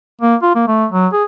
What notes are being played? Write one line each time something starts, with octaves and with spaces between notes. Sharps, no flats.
A#3
F4
A#3
A3
F#3
G#4